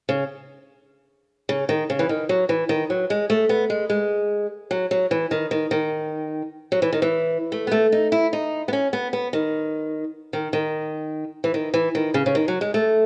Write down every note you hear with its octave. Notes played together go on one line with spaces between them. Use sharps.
C#3
C#3
D#3
C#3
E3
D#3
F#3
E3
D#3
F#3
G#3
A3
B3
G#3
G#3
F#3
F#3
E3
D#3
D#3
D#3
F#3
E3
D#3
E3
A3
B3
A3
D#4
E4
D#4
B3
C#4
B3
B3
D#3
D#3
D#3
E3
D#3
E3
D#3
C#3
C#3
D#3
F#3
G#3
A3